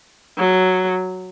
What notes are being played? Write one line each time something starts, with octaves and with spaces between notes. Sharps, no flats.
F#3